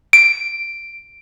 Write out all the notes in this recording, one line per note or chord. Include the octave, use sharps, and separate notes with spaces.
D7